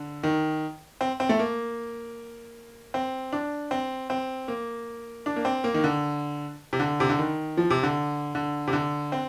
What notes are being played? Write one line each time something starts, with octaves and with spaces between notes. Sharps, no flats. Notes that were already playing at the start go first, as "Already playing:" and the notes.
Already playing: D3
D#3
C4
C4
A3
A#3
C4
D4
C4
C4
A#3
D4
A#3
C4
A#3
D#3
D3
C3
D3
C3
D3
D#3
F3
C3
D3
D3
C3
D3
C4